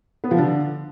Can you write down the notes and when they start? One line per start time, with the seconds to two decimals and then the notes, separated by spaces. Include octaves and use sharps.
0.24 B3
0.31 F3
0.39 D3